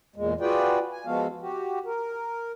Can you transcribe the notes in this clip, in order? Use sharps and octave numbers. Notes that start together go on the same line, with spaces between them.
E2 A#2 G#3
F4 F#4 G#4 B4 D5 G5
G#5
F3 G#3 B3 F#4 A4 F5
F#4 G4
A#4